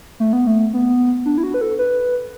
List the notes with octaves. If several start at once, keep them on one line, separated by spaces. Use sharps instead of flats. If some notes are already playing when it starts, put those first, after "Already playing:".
A3
B3
A3
B3
D4
E4
F#4
B4
A4
B4